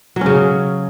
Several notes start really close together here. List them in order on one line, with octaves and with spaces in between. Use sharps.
F#3 C#4 C#3